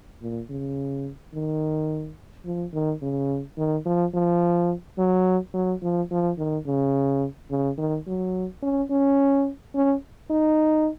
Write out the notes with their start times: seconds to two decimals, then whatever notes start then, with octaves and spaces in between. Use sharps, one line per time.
0.22 A#2
0.50 C#3
1.34 D#3
2.45 F3
2.73 D#3
3.02 C#3
3.57 D#3
3.85 F3
4.14 F3
4.98 F#3
5.54 F#3
5.82 F3
6.11 F3
6.38 D#3
6.66 C#3
7.50 C#3
7.78 D#3
8.07 F#3
8.63 C#4
8.90 C#4
9.75 C#4
10.30 D#4